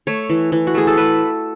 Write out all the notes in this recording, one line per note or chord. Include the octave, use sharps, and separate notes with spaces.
A3 C#5
E3
E3
F#4
A3 G#4
A4
A3 B4